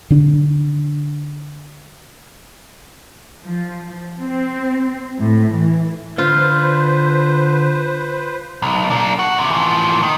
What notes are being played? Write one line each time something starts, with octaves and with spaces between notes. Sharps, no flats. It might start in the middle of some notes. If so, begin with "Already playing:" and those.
D3 D4
F3
C4
A2
E3
D3 F4 B4 C5
B1
A#3 D4
F#4
E2 C3
E3 F3
D#3